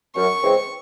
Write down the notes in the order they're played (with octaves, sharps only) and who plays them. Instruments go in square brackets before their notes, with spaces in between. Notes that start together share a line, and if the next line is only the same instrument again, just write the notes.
[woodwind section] F#2 [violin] C#6
[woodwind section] C#3 E3 G#3 C4